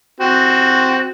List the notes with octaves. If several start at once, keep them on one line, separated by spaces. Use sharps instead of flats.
C4 F#4